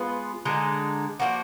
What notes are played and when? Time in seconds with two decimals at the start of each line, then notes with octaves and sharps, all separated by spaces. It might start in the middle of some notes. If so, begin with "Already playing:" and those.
Already playing: G#3 B3 F4 B4
0.45 D3 G#3 D#4
1.19 F3 A#3 D4 F#4